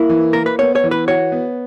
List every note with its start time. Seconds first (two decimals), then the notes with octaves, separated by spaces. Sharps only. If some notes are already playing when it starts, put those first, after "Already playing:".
Already playing: A#3 E4
0.09 E3
0.33 A#3 A#4
0.46 B4
0.59 B3 C#5
0.75 C#5
0.84 E3
0.91 B4
1.08 F#4 C#5
1.32 B3